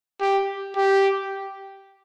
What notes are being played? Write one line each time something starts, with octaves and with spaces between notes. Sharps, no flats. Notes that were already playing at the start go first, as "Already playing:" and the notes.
G4
G4